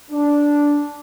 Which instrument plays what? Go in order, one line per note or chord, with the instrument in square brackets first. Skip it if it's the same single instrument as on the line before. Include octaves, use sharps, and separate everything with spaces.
[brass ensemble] D4